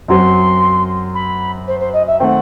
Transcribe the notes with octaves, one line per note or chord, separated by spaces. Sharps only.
F#2 F#3 C4 C6
B5
C5
C5
D#5
E5
D#3 A3 C4 F#5 G5